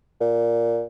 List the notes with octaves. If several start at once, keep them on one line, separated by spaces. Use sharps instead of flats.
A#2